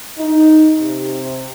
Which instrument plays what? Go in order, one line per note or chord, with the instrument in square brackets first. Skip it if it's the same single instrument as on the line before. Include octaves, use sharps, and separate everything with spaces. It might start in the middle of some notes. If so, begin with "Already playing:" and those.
[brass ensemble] D#4
C3